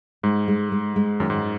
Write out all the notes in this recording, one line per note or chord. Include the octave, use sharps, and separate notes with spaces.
G#2 G#3
G#3
G#3
G#3
F#2 D#3
G#2